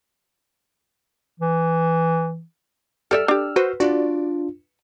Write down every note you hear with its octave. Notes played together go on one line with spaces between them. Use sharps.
E3
G3 A4 D5 E5 E6 F6
D4 G4
F#4 B4 C5
D4 F4 F#4 D5